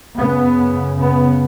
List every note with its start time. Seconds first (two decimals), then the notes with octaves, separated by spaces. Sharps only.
0.18 F#2 C#3 B3
1.00 B3